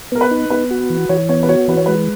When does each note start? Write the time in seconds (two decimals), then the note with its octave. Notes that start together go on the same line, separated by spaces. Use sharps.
0.12 B3 A#4
0.21 B4
0.31 D#4
0.50 B3 B4
0.71 F#4
0.90 E3
1.09 E3 C#5
1.29 B3 C#5
1.43 B4
1.49 F#4 C#5
1.68 E3 B4
1.77 C#5
1.86 G#3 B4